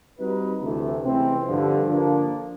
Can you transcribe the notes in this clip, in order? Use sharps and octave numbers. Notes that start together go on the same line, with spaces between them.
G3 C4 D#4 F#4 B4
D2 C3 E3 A3
C#2 C3 E3 A3 C4
G2 D3 F3
D3 F3 A#3 D4